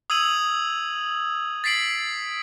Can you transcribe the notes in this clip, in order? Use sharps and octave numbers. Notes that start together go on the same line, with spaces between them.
D#6 E6 G#6 D#7 F#7
A6 B6 C7 D7 F#7